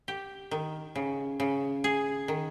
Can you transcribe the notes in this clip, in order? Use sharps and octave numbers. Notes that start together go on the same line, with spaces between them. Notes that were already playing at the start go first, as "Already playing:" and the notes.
G4
D#3
C#3
C#3
G#4
D#3